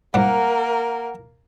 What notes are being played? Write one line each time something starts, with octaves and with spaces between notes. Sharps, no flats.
G#2 G3 A#3 A#4 F#5